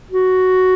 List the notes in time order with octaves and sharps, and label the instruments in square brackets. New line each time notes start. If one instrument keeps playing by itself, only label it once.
[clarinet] F#4